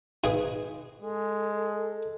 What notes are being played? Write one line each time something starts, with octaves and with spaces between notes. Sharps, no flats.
G#2 B2 G#4
G#3 A4